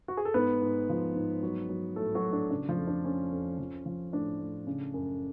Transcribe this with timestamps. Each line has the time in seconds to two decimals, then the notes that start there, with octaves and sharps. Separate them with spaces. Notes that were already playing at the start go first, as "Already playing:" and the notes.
0.08 F#4
0.17 G#4
0.25 A4
0.34 G#2 B3 B4
0.62 G#2
0.89 F3
1.15 G#2
1.43 F#3
1.69 F#3
1.96 A2 A3 A4
2.15 F#3 F#4
2.24 A2
2.33 D4
2.51 C#3 D4
2.68 F3 F4
2.78 F2
2.87 D4
3.05 F2 C#4
3.32 F2
3.59 F3
3.86 F3
4.12 A2 D4
4.40 A2
4.67 C#3
4.94 F#2